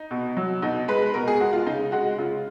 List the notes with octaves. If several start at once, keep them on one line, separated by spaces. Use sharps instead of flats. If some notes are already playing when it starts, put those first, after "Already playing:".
Already playing: D#4
B2
F#3
B2 D#4
G#3 B4
B2 A#4
G#4
G#3 F#4
F4
C#3 D#4
G#3 F#4
C#3 F4